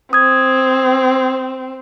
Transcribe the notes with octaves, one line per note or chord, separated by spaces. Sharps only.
C4 D#6 G#6